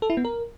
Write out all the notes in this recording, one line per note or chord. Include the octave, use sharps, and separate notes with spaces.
A4
E4
B3
A#4